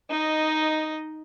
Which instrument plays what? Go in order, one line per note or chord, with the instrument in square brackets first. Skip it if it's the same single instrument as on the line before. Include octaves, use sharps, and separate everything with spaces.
[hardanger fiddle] D#4 D#5